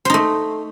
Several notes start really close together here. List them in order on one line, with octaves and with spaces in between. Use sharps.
C5 D#4 A3